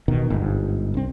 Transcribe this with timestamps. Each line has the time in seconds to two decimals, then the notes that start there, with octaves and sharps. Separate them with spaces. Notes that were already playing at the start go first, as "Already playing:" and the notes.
0.08 E1 B2 D#3
0.30 G1 G#2
0.94 C2 C4